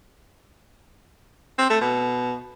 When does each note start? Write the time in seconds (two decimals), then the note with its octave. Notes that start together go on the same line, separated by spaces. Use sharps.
1.58 C4
1.70 A3
1.81 B2